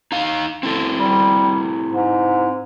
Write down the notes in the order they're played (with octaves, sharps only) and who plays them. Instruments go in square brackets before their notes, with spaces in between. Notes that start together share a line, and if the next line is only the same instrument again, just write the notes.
[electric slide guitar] D#4 F5
C4 E4 A4
[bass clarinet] G3
G#2